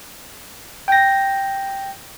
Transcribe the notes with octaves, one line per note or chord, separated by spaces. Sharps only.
G5 A#6